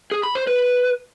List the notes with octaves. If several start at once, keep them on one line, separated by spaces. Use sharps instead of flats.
G#4
B5
C5
B4